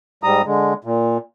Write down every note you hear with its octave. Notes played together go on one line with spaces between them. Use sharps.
G#2 G3 A#5 D#6
D3 G#3
A#2